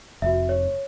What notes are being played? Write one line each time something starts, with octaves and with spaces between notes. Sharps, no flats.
F1 F#4 E5
C#5